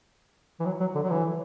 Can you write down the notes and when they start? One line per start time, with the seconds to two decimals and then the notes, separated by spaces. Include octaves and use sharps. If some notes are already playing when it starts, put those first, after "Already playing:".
0.60 E3
0.66 F#3
0.80 F#3
0.95 D3
1.04 F#3
1.10 E3